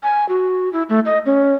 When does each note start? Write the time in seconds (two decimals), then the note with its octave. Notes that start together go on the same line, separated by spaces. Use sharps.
0.03 G#5
0.29 F#4
0.73 E4
0.89 A3
1.05 D#5
1.26 C#4